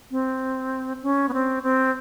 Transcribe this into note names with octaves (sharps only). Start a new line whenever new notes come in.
C4
C#4
B3
C4
C4